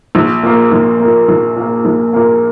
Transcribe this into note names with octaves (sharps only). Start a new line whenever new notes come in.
A#1
A#2 A#3
A#1
A#3
A#2
A#1
A#2 A#3
A#1
A#2 A#3